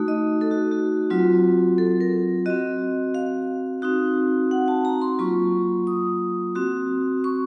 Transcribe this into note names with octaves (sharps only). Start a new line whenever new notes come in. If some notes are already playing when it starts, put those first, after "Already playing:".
Already playing: A3 D#4 F#4
D#5
A4
F#4
F#4
F#3 C4 F4
A4
A#4
C4 F#4 D#5
F5
C4 D#4 F#4
F#5
A5
A#5
C6
F#3 A#3 F4 C#6
D#6
C4 F#4
C#6